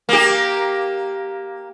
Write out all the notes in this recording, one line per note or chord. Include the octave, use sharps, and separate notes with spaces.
A#3 G4